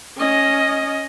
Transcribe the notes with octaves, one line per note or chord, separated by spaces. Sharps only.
C#4 D#5